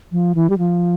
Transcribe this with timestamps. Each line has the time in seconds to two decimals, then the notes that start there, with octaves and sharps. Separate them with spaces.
0.12 F3
0.35 E3
0.50 G3
0.58 F3